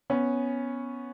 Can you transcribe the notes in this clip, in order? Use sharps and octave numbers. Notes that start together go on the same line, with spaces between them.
B3 C#4